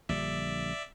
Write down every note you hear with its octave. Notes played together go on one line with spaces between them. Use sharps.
A#1 D3 G3 D5 E5